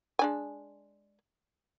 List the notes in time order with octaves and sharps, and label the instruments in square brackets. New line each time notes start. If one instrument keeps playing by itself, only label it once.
[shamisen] G#3 D4 G#5